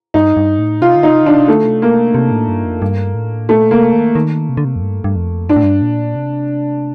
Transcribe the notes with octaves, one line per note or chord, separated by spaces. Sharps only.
G2 D#4
G2
A2
C3 F4
D3
D#4
C3
D3 D4
C3
D3 A3
C3
A#3
C3
A2
G2
F2
G2
A2
A#2 A3
C3 A#3
D#3
D#3
C3
D3
C3
F2
G2
G2
F2
G2 D4
A2
G2
A#2
C3